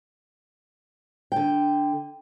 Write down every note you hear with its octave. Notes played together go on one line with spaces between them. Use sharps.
D3 G5